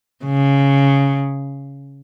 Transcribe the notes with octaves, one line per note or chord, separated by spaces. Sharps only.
C#3